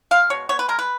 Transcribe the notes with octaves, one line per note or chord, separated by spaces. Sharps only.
G#3 F5
B2 C#5
B3 C#5
B4
G#3 A#4
B4